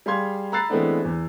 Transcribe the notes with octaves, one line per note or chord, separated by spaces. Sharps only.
G3 G#4 F5 C6 G#6
A#5 B5 E6 F#6 A6 C7
E3 G#3 A3 B3 C4 D4
E2